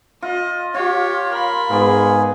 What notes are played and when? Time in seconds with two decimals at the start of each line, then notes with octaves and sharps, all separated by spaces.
0.23 F4 D#5
0.74 F4 G4 C#5
1.32 A#4 B5
1.71 G#2 B3 G#4 D5 D6